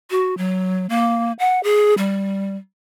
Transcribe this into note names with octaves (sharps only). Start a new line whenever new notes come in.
F#4
F#3
A#3
F#5
G#4
G3